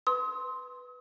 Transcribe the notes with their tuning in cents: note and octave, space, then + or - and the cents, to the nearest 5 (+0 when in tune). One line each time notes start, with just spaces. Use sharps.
B4 +0 C6 +0 D#6 +45